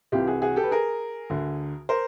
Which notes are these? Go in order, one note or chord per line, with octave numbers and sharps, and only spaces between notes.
C2 C3 E3 F4 G4
F#4 G#4
F#4 G#4
G4 A4
B4
G#4 A#4
D2 D3
A#4 C5